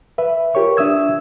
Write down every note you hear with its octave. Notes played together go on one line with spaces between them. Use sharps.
B4 E5
F4 G4 A#4 C#5 C#6
D4 E5 D#6 E6 G#6